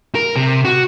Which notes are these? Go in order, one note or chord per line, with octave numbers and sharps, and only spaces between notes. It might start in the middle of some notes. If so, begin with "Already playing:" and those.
A#4
C3
F#4